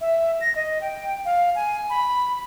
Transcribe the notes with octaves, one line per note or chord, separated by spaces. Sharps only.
E5
A#6
D#5
G5
F5
G#5
B5